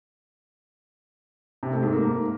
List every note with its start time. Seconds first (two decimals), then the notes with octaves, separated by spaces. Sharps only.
1.63 C3
1.73 A3
1.83 G#2
1.93 A#3